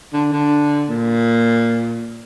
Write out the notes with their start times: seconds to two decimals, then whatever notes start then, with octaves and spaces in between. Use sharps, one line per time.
0.13 D3
0.32 D3
0.89 A#2